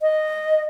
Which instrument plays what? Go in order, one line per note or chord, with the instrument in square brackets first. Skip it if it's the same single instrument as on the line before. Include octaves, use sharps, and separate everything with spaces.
[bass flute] D#5